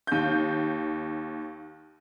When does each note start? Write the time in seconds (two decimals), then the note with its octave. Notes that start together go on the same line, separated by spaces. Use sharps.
0.07 D#2 G6